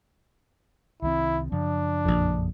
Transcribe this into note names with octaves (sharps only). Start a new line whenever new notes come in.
C2 D#3 C4 E4
F#2 C#3 F3 D4
A#1 F2